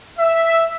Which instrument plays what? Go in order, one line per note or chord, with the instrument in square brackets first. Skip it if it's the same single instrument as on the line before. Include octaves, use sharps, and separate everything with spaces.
[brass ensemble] E5